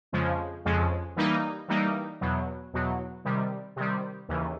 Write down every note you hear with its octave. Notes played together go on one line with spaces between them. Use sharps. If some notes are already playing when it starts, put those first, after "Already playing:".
F2 C#3 F3 G#3
F2 C#3 F3 G#3
E3 G3 A#3 D#4
E3 G3 A#3 D#4
E2 B2 F#3
E2 B2 F#3
C3 D#3 G3
C3 D#3 G3
D#2 C#3 E3